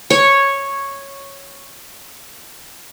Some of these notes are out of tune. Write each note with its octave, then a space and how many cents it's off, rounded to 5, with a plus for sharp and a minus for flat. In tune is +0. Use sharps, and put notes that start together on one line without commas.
C#5 -5